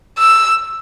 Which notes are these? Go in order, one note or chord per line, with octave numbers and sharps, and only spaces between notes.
E6